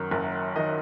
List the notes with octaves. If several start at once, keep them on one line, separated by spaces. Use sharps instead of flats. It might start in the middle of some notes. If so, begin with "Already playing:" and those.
Already playing: F#2 D#3
F#1
D#3 D#5